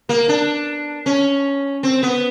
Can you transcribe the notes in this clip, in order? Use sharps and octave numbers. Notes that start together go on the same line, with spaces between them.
A#3
D4
C#4
C4
B3